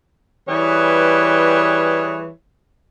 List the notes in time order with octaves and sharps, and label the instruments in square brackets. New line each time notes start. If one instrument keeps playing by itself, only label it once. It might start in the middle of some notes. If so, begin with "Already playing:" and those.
[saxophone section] E3 G3 G#4 B4 C#5